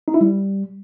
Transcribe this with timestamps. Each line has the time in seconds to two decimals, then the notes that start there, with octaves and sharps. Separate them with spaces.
0.08 D#4
0.14 E4
0.21 G3